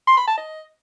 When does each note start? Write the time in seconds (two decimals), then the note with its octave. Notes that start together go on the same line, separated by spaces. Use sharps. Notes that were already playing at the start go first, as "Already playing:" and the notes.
0.07 C6
0.17 B5
0.27 A5
0.37 D#5